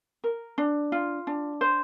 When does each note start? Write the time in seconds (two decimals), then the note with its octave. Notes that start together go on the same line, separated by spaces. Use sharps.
0.24 A#4
0.58 D4
0.92 F4
1.27 D4
1.61 C5